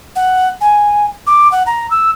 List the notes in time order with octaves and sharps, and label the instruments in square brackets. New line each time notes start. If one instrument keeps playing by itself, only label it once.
[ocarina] F#5
G#5
D6
F#5
A#5
E6